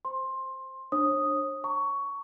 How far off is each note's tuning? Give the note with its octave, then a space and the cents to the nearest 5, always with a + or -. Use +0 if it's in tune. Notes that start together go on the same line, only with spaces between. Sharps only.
C5 +0 C6 +20
D4 +20 C#5 -45 D#6 +0
A#5 -35 C#6 +15